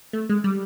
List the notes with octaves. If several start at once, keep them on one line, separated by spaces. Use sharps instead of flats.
A3
G#3
G3